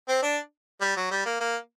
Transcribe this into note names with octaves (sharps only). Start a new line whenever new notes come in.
C4
D4
G3
F#3
G3
A#3
A#3